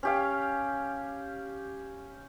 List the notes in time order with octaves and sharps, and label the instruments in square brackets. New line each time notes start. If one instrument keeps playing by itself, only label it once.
[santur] C#4 G4 F5